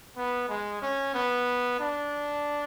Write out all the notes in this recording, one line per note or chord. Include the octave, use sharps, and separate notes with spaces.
B3
G#3
C#4
B3
D4